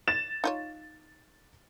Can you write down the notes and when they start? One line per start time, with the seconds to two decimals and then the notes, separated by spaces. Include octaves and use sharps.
0.07 A6 E7
0.44 D#4 F4 C#5